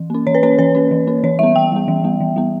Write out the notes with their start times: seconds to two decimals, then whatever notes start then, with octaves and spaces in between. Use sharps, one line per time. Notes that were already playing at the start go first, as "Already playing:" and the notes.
Already playing: E3
0.10 A#3 C#4
0.27 E3 C#5
0.35 B4
0.43 A#3 C#4 C#5
0.59 E3 B4
0.75 A#3 C#4
0.91 E3
1.07 A#3 C#4
1.24 E3 C#5
1.39 G3 B3 E5
1.56 E3 G5
1.72 G3 B3
1.88 E3
2.04 G3 B3
2.20 E3
2.36 G3 B3